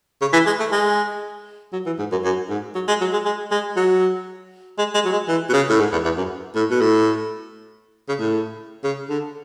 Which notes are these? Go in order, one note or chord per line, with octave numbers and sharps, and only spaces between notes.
C#3
E3
G#3
A3
G#3
F#3
E3
G#2
F#2
F#2
G#2
F#3
G#3
F#3
G#3
G#3
G#3
F#3
G#3
G#3
F#3
G#3
E3
B2
C#3
A2
G#2
E2
E2
F#2
A2
B2
A2
C#3
A2
C#3
D3